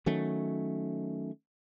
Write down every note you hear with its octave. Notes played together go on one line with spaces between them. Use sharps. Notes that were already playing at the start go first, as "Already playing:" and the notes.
D#3 F#3 A3 C#4